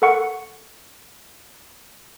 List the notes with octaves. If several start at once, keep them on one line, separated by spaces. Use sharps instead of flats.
A4 A#4 F#5 C#6 C#7